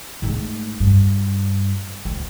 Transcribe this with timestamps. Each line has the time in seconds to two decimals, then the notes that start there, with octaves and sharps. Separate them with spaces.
0.22 G#2 A3
0.80 G2
2.05 D2